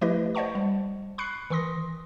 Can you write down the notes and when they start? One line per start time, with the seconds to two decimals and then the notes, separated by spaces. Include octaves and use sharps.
0.01 F3 A3 E4 G4 B4 D#5
0.35 C5 D5 D#5 F#5 A5 C#6
0.55 G3
1.18 B5 C#6 F#6 C7 C#7
1.50 D#3 E3 C6 D#6 A#6